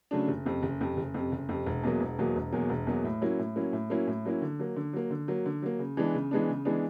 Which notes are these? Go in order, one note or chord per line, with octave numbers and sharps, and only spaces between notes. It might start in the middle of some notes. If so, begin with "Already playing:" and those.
C#3 F#3 A3 D4
F#1
F2 C3
F#1
F2 C3
F#1
F2 C3
F#1
F2 C3
E1
E2 B2 F#3 A#3
E1
E2 B2 F#3 A#3
E1
E2 B2 F#3 A#3
E1
E2 B2 F#3 A#3
A2
F#3 A#3 C#4 E4
A2
F#3 A#3 C#4 E4
A2
F#3 A#3 C#4 E4
A2
F#3 A#3 C#4 E4
D3
F#3 A#3
D3
F#3 A#3
D3
F#3 A#3
D3
F#3 A#3
C#3
E3 G#3 B3 D4
C#3
E3 G#3 B3 D4
C#3
E3 G#3 B3 D4